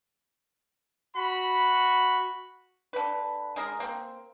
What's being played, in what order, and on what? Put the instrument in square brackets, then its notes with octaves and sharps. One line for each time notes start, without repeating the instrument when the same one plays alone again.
[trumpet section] F#4 B5
[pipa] D3 B4
G#3 G#4 A#4
A#3 C4